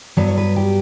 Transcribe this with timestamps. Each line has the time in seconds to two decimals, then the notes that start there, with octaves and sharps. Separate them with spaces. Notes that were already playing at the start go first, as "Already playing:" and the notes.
0.17 G2 F#3 B3 B4
0.28 C#5
0.37 B4
0.56 G4